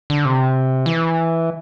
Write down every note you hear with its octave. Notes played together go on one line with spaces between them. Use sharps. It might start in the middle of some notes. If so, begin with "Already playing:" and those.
D3
C3
E3